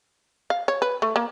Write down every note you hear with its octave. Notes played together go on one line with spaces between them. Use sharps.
F5
C#5
B4
A3
A#3